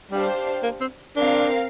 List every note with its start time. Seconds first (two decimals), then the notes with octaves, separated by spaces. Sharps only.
0.11 G3 D4 G4 C5 F5
0.63 A#3
0.81 C4
1.16 C4 D4 A#4 F5